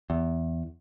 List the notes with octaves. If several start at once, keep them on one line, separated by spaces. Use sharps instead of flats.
E2